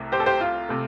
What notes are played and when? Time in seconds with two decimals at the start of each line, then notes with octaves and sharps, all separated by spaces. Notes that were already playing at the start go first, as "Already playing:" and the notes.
Already playing: C2 C3 A3
0.12 G4 C5
0.20 A4
0.26 G4 C5
0.41 F4
0.69 C3 A3